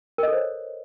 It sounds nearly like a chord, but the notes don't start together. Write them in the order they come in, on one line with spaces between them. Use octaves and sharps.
A#4 D#5 A4 C5 C#5